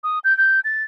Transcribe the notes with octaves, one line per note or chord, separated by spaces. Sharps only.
D#6
G6
G6
A6